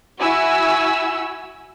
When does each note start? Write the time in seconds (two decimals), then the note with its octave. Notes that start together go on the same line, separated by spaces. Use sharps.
0.19 E4 F#4 G#5 E6